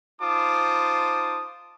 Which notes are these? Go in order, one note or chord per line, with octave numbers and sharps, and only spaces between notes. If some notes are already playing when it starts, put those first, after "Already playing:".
D#4 F4 C5 A5 D6 D#6